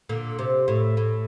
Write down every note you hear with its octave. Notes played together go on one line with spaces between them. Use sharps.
A#2 D3
C3
A2
A2